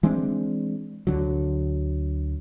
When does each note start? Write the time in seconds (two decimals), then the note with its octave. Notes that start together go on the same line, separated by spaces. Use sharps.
0.03 E3 G#3 C4 D4
1.07 D2 D3 F#3